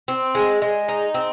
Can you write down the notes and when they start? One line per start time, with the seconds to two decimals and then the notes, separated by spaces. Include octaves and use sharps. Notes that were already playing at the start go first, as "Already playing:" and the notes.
0.08 C4
0.35 G#3
0.62 G#3
0.88 D#4
1.14 C4